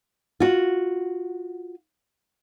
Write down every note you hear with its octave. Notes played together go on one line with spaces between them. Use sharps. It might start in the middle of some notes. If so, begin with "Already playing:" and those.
F4 F#4